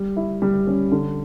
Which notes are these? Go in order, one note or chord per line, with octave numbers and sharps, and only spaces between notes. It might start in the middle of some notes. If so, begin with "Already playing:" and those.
Already playing: G3
E4
G3
C#4
D3